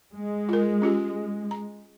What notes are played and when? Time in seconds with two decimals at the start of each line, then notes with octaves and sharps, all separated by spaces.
0.14 G#3
0.49 F4 A#4
0.82 C#4 F4 G4
1.51 A#5